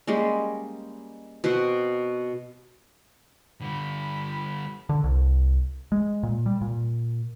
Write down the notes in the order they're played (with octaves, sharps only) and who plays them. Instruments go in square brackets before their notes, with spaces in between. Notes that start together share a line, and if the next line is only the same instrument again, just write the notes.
[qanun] G3 G#3 A#3 C#4
B2 B3 C4 F#4
[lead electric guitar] D3 G3 [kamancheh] B5
[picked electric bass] D3
C2
G#3
A#2
G3
A#2